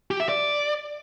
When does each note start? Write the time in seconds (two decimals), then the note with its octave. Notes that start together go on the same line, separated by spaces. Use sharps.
0.11 G4
0.20 E5
0.29 D5